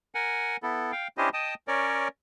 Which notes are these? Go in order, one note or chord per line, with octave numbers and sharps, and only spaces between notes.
A#4 F#5 G#5
B3 E4 A4
F5 G5
C#4 D4 E4 G4 C5 D#5
D#5 G5 A5 D#6
C#4 A#4 C#5 D5